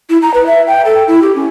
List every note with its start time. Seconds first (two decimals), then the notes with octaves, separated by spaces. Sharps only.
0.10 E4
0.22 A#5
0.34 B4
0.46 E5
0.67 G5
0.85 A4
1.08 E4
1.22 G4
1.36 C#4